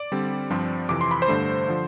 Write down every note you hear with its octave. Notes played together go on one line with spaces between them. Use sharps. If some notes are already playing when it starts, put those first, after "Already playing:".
Already playing: D5 D6
D3 G3 C4
G2 F3 C4 F4
F2 C3 E3 D6
C6
B5
C5 C6
G2 D3 A3
D3 F3